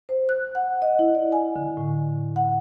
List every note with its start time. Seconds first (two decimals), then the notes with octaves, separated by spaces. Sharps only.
0.09 C5
0.29 F#6
0.55 F#5
0.82 D#5
0.99 E4
1.15 D5
1.32 G#5
1.56 D3
1.77 A2
2.36 F#5